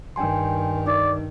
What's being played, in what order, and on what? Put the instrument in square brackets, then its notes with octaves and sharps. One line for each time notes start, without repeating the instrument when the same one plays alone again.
[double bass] G2 D#3 [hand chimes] G5 G#5 C6
[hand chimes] D#4 [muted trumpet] D5